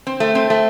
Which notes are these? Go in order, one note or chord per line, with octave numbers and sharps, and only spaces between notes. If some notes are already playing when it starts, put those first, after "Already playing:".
C4
A3
C4
A3